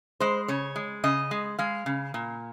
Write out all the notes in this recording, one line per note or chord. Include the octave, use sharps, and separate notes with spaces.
G#3 C5
C#3 C#5
G#3
C#3 D#5
G#3
G#3 F5
C#3
A#2